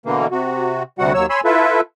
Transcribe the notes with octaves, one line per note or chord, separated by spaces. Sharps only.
B2 D3 E3 A#3
C3 F#4
D2 C3 G3 F#4 F#5
D#2 F#3 C#5 E6
C#5 G#5 B5 C6 E6
E4 F4 A4 B4 E5